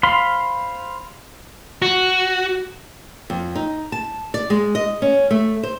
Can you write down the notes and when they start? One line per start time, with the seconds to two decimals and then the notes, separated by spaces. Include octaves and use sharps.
0.03 C5 F5 B5 C6
1.82 F#4
3.30 F2
3.55 D#4
3.92 A5
4.34 D5
4.50 G#3
4.75 D#5
5.02 C#4
5.31 A3
5.63 C5